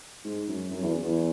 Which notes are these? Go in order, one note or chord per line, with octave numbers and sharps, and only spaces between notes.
G#2
F#2
F#2
E2
E2